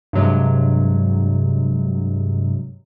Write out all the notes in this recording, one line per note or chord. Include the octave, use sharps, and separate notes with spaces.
G2 C3 F#3 G#3